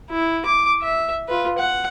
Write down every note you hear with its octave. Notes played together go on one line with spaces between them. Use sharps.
E4
D6
E5
F4 B4
F#5